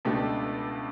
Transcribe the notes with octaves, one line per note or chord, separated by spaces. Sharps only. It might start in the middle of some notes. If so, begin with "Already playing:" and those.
C#2 B2 A3 D4 G4